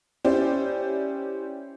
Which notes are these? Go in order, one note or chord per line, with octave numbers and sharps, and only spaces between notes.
C#4 E4 G4 C5 D5